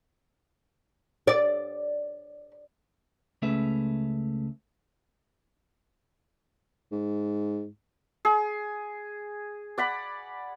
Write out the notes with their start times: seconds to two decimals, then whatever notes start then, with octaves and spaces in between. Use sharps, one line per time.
1.27 D5
3.42 C#2 A3 C#4 G#4 B4 E5
6.92 G#2
8.25 G#4
9.78 D5 F#5 B5